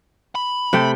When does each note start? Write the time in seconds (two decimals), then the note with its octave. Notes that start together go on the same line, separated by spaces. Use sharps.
0.35 B5
0.73 C3 A3 G5